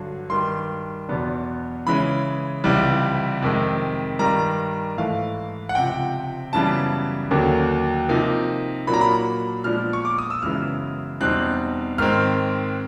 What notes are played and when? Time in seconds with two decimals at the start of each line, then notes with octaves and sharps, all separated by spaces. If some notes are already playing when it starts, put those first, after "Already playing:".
Already playing: G2 D3 F#3
0.30 G2 D#3 G3 C6
1.09 E2 B2 F#3 B3 D4
1.86 C#3 E3 G#3 C#4 B5
2.64 C#2 C3 E3 G3
3.42 F2 C3 D#3 G#3
4.19 G2 D#3 G3 A#5
4.97 G#2 E3 A3 F5
5.69 F#5
5.75 C#2 C3 F3 G5
6.53 F#2 C#3 E3 G3 B3 A5
7.31 D#2 D3 F#3 A#3
8.09 C3 F3 A#3 D#4
8.87 A#2 F#3 A#3 D4 B5
8.94 A#5
9.01 B5
9.64 A#2 F3 G#3 B3 D4 F6
9.93 C#6
10.05 D6
10.18 D#6
10.30 E6
10.42 F#2 C#3 E3 G#3 B3 F6
11.20 E2 B2 G3 C4 D#4 F#6
11.98 G#2 D#3 G#3 C4 F6